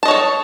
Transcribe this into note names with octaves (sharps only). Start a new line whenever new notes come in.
A4 C#5 D#5 A5